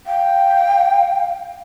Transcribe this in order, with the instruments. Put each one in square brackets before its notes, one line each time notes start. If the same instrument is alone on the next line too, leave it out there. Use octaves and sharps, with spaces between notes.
[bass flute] F5 [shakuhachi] G5